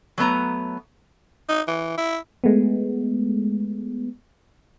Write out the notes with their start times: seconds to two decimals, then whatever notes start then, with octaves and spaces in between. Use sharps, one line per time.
0.18 F#3 A3 B3 A#5
1.49 D#4
1.68 E3
1.98 E4
2.44 G#3 A3 B3